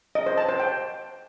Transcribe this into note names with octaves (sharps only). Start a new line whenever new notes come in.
D#5
C5
A5
C5
G5